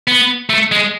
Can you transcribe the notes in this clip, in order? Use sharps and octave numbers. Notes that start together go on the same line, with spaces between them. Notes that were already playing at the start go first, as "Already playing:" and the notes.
B3
A3
G#3